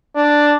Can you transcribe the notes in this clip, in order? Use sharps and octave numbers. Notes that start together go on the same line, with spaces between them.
D4